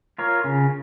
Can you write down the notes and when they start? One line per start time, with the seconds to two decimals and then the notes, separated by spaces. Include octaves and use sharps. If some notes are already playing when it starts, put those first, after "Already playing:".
0.18 F4 A#4 C#5
0.44 C#3